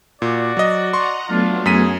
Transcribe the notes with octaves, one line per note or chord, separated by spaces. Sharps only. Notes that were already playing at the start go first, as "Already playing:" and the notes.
A#2 F#4 D5
F#3 D#5
D#5 F#5 A#5 C6 C#6
F#3 A3 B3 D4 F4
F#2 G#4 B6 D#7